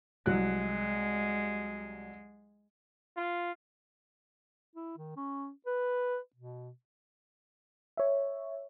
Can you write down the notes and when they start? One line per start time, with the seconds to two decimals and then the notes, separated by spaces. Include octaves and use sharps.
0.26 C2 F#3 G#3 F#6
3.17 F4
4.76 E4
4.98 D#3
5.17 C#4
5.66 B4
6.36 B2
7.97 C#5 E5